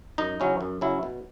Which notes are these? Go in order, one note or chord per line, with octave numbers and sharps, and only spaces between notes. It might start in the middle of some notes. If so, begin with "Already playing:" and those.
F#2 D#4 D#5
C#3 F#3 C#4 E4
F#2
C#3 F#3 C#4 E4
B2